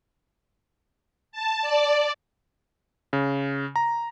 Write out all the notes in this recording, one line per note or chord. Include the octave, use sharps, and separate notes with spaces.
A5
D5
C#3
A#5